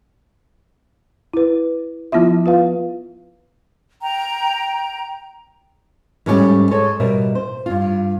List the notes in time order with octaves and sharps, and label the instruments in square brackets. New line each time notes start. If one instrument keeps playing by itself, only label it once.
[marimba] E4 B4
F3 B3 E4 F4 E5
F4 B4 F5
[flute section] G5 A#5
[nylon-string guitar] G#2 G3 A3 C#4 F4 G4
G#3 A4 C#5
B2 G3 A#4 E5
C5
G2 F4